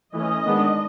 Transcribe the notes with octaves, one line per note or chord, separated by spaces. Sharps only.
E3 A3 C#4 D#5
D#3 G#3 B3 D4